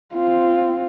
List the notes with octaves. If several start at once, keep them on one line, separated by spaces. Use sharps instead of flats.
C4 F4